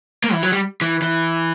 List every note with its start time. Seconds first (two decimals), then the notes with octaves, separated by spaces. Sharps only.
0.24 A#3
0.33 E3
0.43 F#3
0.52 G3
0.81 E3
1.02 E3